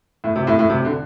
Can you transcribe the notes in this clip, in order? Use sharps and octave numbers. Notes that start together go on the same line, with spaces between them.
A2
C3
A2
A2
C3
D3